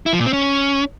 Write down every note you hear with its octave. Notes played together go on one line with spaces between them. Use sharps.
E4
F3
A#2
C4
C#4